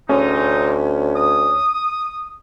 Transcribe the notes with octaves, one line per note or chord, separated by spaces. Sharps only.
D2 G#2 C3 C#4 D#4
D#6